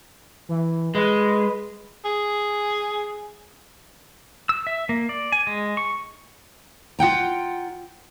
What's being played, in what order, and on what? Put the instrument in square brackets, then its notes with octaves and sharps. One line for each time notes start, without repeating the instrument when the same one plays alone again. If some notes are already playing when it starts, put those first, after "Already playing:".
[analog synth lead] E3
[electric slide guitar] G#3 [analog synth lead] B4
[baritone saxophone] G#4
[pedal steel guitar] E6
E5
A#3
D5
G#5
G#3
C#6
[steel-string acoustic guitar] F4 F#5 G5 A#5